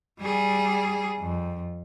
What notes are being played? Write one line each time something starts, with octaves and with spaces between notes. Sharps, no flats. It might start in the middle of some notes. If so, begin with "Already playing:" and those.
G3 G#4
F2